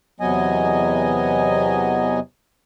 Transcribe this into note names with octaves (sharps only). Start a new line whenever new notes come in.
E2 C3 F#3 B3 D#5 G#5